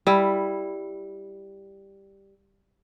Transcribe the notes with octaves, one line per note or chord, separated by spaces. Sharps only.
G3 E4